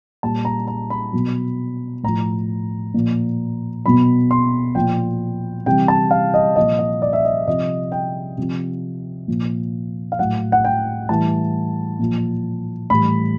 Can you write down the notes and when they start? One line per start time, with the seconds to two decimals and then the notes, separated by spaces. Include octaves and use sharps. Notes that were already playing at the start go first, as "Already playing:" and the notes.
0.23 A#2 G3 A5
0.45 A#5
0.68 A#5
0.90 B5
1.13 B2 F#3
2.03 A2 F3 A#5
2.94 A#2 F3
3.85 B2 F#3 B5
4.31 C6
4.75 A#2 F3 G5
5.66 C3 E3 G3 G5
5.88 A5
6.11 F5
6.34 D#5
6.56 A#2 F3 D#5
6.79 D#5
7.02 D5
7.13 E5
7.25 D#5
7.47 C3 F3 D#5
7.92 G5
8.38 C3 F3
9.28 A#2 F3
10.12 F5
10.19 A2 F#3 F#5
10.52 F#5
10.64 G5
11.09 A2 E3 G3 A5
11.99 A#2 F3
12.90 A2 E3 G3 B5